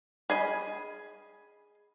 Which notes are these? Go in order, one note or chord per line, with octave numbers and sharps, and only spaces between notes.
G#4 D#5 B5